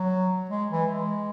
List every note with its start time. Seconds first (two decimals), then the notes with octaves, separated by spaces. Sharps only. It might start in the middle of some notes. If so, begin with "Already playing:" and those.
Already playing: F#3
0.50 G#3
0.70 E3
0.91 G#3